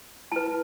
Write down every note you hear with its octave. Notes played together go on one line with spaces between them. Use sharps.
E4 B4 A5